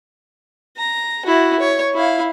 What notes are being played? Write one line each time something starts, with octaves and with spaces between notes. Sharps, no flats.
A#5
E4 F#4
C#5
E4 F5